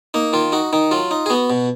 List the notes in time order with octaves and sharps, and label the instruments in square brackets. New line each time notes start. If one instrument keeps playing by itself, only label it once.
[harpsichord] A#3 D#4
D#3 F4
D#4 F#4
D#3 D#4
F#3 F4
D#4
G#4
B3 F#4
B2